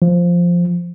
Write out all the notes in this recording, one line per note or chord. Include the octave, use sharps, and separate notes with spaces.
F3